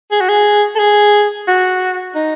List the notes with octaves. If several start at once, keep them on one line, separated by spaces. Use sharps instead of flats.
G#4
F#4
G#4
A4
G#4
F#4
D#4